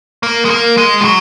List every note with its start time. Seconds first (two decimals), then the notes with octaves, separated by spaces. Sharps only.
0.23 A#3
0.45 G#3
0.50 A#3
0.77 G#3
1.01 F3
1.04 F#3